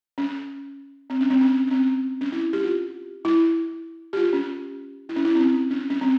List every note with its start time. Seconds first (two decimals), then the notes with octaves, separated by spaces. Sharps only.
0.18 C#4
1.10 C4
1.21 C#4
1.30 C4
1.41 C#4
1.67 C#4
1.71 C4
2.21 C#4
2.32 E4
2.53 G4
2.64 F4
3.25 E4
4.13 G4
4.17 F4
4.33 C#4
5.09 E4
5.16 C#4
5.25 E4
5.35 C4
5.40 C#4
5.71 C#4
5.90 C#4
6.01 C4